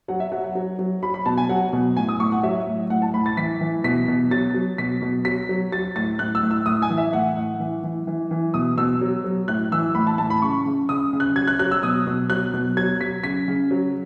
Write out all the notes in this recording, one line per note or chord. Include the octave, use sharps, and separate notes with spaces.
F#3 F#5
E5
F#3 F#5
F#5
F#3
F#3
F#3 B5
B5
B2 A5
G#5
F#3 F#5
B2
A2 G#5
D#6
A2 C#6
F#5
F#3 E5
A2
A2 F#5
A5
A2 B5
A6
E3 B6
E3
B2 B6
B2
F#3 A6
F#3
B2 B6
B2
F#3 B6
F#3
F#3 A6
A2 A6
A2 F#6
E6
A2
E6
A2 D#6
G#5
E3
E5
A2 F#5
A2
E3
E3
E3
E3
B2 D#6
B2 E6
F#3
F#3
A2 F#6
E3 E6
A2 B5
A5
A2 A5
B5
C#3 C#6
C#3
C#3 D#6
C#3
F#6
F#3 G#6
F#6
F#3 F#6
E6
B2 D#6
B2
F#3 F#6
B2
F#3 G#6
F#3 B6
C#3 B6
C#3
F#3